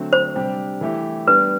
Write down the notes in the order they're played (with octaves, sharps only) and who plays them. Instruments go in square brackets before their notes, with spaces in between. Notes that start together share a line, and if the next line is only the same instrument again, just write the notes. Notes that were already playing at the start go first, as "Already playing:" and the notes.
Already playing: [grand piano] D3 F#3 A3 C4
[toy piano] C5
[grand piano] C3 G3 D4 G4
E3 A3 E4 G4
[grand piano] G3 B3 D4 [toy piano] B4